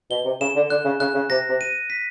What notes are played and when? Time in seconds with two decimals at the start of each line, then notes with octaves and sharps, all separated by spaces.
0.11 B2 G7
0.25 C3
0.41 C#3 E7
0.56 D3
0.70 D3 F#6
0.85 C#3
1.00 C#3 F#6
1.15 C#3
1.30 C3 A#6
1.50 C3
1.61 D#7
1.90 B6